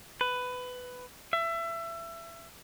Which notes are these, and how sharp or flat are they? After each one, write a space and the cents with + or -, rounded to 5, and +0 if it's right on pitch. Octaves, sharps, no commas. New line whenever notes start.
B4 +15
E5 +25